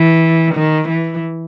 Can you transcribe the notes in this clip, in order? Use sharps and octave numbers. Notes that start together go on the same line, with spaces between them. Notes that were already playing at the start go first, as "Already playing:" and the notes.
Already playing: E3
D#3
E3